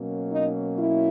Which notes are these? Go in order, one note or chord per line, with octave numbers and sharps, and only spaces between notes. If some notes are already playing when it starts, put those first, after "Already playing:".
Already playing: B2 F#3 A#3 C#4
D#4
E4